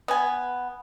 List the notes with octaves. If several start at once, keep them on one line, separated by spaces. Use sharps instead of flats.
B3 G#5